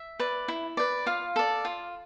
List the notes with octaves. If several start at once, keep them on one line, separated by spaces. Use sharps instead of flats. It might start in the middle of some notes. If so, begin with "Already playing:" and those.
Already playing: E5
B4 D5
E4
B4 D5
F4 F5
A4 D5
F4